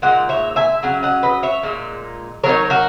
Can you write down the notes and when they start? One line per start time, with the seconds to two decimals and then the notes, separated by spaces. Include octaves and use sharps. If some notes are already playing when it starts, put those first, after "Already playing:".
0.02 A#2 G#3 D#4 F#5
0.29 C#5 E5
0.56 E5 G#5
0.83 C#3 F#3 C#4 F#5
1.03 D#5 F#5
1.23 B4 D#5
1.43 C#5 E5
1.63 A#2 G#3 D#4
2.44 F#3 B3 A#4 C#5
2.49 D#4
2.70 F#4 A#4